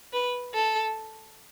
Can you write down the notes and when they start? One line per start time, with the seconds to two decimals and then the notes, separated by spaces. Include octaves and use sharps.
0.13 B4
0.54 A4